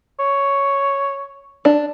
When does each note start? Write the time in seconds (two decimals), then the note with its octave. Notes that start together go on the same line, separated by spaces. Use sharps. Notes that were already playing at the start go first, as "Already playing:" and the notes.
0.20 C#5
1.65 D4